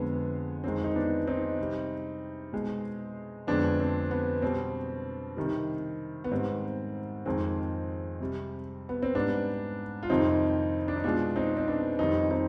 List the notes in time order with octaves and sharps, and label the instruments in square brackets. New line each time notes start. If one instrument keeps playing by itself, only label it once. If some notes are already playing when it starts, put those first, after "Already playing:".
Already playing: [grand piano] F2 D3 G#3 B3
F2 D#3 G#3 C4
D#4
B3 D4
C4 D#4
C3 G3
B2 G#3
F2 D3 G#3 B3 D4
C4
B3
B2 G3 C4
C3 D#3 G3
B3
G#2 D#3 G3 C4
F2 D#3 G#3 C4
C3 G3
B3
C4
G#2 G3 B3 D4
F4
F2 C3 D#3 G3 C4 D#4
D4
D#4
B2 G#3 D4 F4
C4 D#4
C4
B3 D4
F2 D#3 G3 C4 D#4
C4 D#4